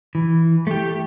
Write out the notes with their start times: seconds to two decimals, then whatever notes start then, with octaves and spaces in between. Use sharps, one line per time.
0.15 E3
0.67 A3 G4